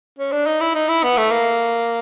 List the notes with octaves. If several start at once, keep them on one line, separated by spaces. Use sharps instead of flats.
C#4
D4
D#4
E4
D#4
E4
B3
A3
A#3